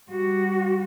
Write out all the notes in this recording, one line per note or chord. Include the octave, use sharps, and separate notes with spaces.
G3 F#4